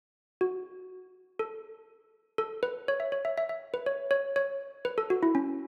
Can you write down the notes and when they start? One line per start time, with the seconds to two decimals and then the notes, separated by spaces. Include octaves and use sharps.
0.41 F#4
1.39 A4
2.38 A4
2.63 B4
2.88 C#5
3.00 E5
3.12 C#5
3.25 E5
3.38 E5
3.49 E5
3.74 B4
3.86 C#5
4.11 C#5
4.36 C#5
4.85 B4
4.98 A4
5.10 F#4
5.23 E4
5.35 C#4